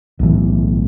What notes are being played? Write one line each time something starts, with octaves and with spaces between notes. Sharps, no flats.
B1 A2 E3